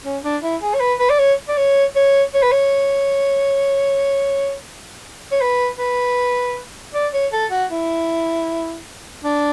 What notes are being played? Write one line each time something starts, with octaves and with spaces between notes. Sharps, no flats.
C#4
D4
E4
G#4
C#5
B4
B4
D5
C#5
D5
C#5
C#5
C#5
B4
C#5
C#5
B4
B4
D5
C#5
A4
F#4
E4
D4